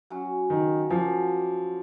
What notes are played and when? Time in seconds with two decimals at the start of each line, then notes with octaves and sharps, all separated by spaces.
0.10 F#3 C#4 F#4
0.50 D#3
0.89 F3 F#3 A#3 C#4